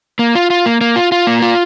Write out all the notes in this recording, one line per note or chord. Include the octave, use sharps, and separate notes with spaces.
A#3
F4
F4
A#3
A#3
F4
F4
A#3
F4